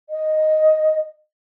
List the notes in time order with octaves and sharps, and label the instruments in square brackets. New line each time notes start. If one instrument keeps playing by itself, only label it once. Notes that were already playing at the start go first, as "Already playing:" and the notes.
[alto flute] D#5